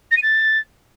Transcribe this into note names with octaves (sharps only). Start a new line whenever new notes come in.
A#6
D#7
A6